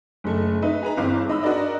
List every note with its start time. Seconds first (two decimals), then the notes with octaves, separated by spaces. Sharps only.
0.24 F#1 A3
0.62 D#4 B4 E5
0.83 G#4 B4 A#5
0.97 G1 E3 C4 F5 D6
1.28 G#2 D#5 B5 E6
1.42 D4 F#4 A#4 D5 D#5